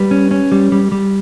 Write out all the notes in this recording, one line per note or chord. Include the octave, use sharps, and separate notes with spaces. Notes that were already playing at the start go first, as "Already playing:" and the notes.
Already playing: G3 B4
C#4
C#4
G3
G3
G3